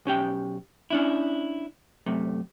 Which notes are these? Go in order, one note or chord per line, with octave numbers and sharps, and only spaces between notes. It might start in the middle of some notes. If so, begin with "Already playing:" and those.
B1 C#4 G4 G5
C#4 D4 E4
F#2 C3 A3